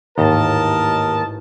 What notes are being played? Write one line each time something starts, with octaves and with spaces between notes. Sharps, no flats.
A1 D#2 G#2 A#4 D#5 A5